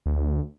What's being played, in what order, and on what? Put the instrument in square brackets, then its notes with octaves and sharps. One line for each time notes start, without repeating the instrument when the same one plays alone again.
[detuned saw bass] D2